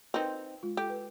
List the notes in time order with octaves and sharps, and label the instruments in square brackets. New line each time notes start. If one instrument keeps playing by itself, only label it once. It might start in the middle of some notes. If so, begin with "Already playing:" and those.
[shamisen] C4 D#4 [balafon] A#4 B4 G5
[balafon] G#3 F4
[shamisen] G4 [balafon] A4
[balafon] B4